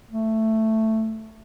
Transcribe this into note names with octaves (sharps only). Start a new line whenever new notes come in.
A3